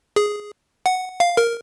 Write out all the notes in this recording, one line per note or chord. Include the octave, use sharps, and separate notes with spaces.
G#4
F#5
F5
A#4